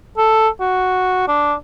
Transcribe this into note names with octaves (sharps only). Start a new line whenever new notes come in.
A4
F#4
D4